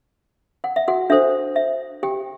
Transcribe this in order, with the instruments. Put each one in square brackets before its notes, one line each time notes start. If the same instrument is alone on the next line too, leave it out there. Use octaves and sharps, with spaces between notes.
[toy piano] F#5
E5
F#4 F#5
D4 A4 C5 E5
E5
G4 G5